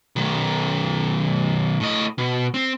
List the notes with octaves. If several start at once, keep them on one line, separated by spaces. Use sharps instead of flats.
B1 D#3
A2 D#5
B2
C4